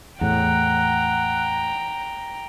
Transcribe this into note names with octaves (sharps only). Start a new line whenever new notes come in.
E2 A2 F#5 G5 A#5